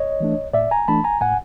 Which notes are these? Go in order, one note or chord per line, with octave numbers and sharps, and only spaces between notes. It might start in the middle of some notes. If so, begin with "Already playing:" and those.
Already playing: C#5 D#5
E3 A3 D4
A2 D5 E5
G#5 A#5
E3 A3 D4 A5 B5
G#5 A#5
A2 F#5 G#5